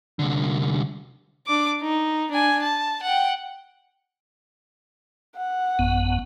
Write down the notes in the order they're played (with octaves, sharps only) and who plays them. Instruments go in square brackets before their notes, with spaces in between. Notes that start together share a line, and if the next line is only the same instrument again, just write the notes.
[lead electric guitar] C2 D3
[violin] D4 D6
D#4
D4 G#5
A5
F#5 G5
[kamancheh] F#5
[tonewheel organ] A1 F#2 B3